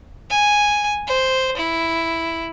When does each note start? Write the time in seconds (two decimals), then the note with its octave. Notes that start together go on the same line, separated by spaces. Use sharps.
0.30 G#5
1.07 C5
1.57 E4